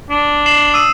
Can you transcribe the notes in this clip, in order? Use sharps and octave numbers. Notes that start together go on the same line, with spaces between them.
D4
C7 E7 F#7
D#6 E6 D#7